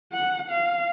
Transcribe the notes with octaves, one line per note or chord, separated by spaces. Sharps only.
F#5
F5